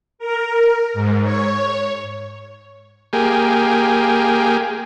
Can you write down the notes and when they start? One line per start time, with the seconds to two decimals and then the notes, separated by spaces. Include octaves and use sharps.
0.19 A#4
0.94 G#2
1.23 C#5
3.13 A#3 G4 G#4